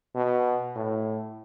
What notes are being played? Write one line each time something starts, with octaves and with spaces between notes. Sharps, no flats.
B2
A2